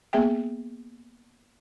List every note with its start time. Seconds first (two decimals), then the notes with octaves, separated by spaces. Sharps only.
0.13 A#3 B3 G#4 E5 G5